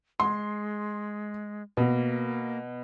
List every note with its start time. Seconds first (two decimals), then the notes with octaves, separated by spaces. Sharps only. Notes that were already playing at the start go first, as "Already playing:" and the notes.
0.20 G#3 C6
1.77 B2 A#3